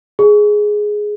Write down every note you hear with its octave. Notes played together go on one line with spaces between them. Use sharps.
G#4